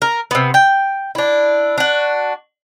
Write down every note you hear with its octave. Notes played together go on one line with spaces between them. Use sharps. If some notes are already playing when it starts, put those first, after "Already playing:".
A#4
C3 B3
G5
D4 E4
D4 F#4